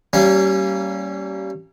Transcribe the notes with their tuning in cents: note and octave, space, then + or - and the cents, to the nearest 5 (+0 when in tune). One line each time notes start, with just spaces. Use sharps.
G3 -25 A#3 -30 C#4 +0